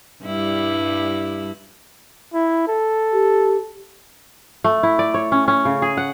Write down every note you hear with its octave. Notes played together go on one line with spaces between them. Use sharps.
G2 G3 E4
E4
A4
G4
A3
E4
D5
C#5
C#4
C#4
C#3
G#4
F#5